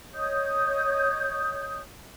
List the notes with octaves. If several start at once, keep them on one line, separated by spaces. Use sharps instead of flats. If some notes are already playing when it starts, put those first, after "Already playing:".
C#5 D#5 D#6 G6